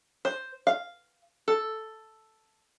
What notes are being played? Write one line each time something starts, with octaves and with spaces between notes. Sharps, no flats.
C5
F5
A4